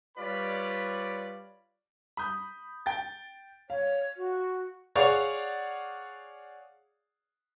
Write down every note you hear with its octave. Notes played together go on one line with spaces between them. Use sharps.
G3 F4 B4 C#5 D5 B5
B5 D#6 G6
G5 A6
C#5 F5
F#4
G#4 C#5 D5 F5 F#5